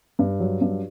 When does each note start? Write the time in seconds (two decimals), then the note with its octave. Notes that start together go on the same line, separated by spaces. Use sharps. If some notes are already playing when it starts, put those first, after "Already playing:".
0.19 G2
0.40 F#3
0.61 G2